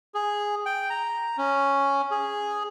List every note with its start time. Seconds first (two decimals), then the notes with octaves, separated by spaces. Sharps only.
0.14 G#4
0.66 G5
0.90 A#5
1.37 C#4
2.11 G#4